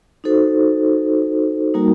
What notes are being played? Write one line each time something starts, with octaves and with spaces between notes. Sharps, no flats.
D#4 F#4 A4 C5
G3 A#3 D#4 F#4 A#4